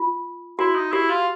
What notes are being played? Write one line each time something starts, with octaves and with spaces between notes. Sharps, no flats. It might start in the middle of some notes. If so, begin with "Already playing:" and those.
Already playing: F4
E4 F#4
D#4
E4 G4
F4